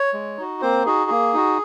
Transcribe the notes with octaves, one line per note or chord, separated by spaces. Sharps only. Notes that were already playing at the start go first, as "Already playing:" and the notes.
Already playing: C#5
G#3
D#4 F#4
A#3 C4 C5
D#4 F#4 G#4
A#3
D#4 F#4